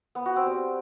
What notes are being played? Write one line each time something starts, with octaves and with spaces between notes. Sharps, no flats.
B3
F#4
C4
G3